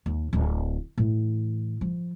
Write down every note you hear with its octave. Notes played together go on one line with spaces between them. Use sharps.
D#2
D1 A3
A2 E3
F3